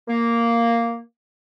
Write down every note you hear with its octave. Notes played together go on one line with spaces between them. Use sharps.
A#3